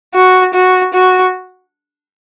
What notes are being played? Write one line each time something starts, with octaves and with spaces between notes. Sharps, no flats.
F#4
F#4
F#4